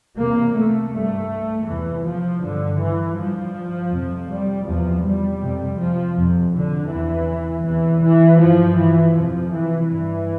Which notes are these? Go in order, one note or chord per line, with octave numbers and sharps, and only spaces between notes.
E2 C3 A#3
A3
G2 A3
E2 C3 E3
F3
G2 D3
E3
G2 F3
F2 C3
G3
E2 C3 F3
G3
F2 C3
F3
F2 C3
D3
E2 C3 E3
E2 C3 E3
E3
G2 F3
E3
F2 C3 F3
E3
G2 E3